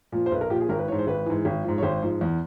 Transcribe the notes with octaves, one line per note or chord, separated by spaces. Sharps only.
A#2 F3
C5
B1 B4
A#4
A#2 F3 G4
G#4
G#1 A#4
B4
G#2 E3 C#5
C5
G#1 B4
G#2 E3
G#1
G#2 F3
C#5
G#1 C5
G#2 F3
E2